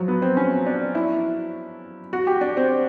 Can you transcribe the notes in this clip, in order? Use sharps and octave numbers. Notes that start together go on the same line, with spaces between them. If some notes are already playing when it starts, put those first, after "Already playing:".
Already playing: F3 F#3
B3
C4
C#4
D4
E4
F#4
G4
D4
C4